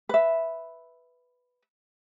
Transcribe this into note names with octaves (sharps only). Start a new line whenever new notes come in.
B4 E5